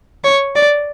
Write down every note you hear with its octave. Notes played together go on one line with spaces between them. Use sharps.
C#5
D5